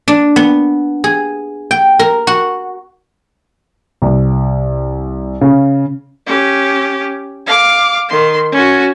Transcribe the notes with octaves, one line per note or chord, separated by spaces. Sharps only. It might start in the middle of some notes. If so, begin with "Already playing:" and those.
D4
B3
G#4
G5
A#4
F#4
C2
C#3
C#4 G4
F5 D6
D#3 C6
C#4 F#4